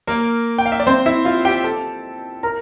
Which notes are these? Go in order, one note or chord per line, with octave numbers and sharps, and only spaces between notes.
A#3 A#4
G5
F5
E5
D5
C4 C5
E4 E5
F4 F5
G4 G5
A4 A5
A#4 A#5